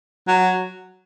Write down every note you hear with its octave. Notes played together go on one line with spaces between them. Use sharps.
F#3